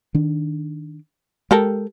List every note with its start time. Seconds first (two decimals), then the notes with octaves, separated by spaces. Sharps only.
0.15 D#3 D4
1.51 G#3 G4 A4 A#4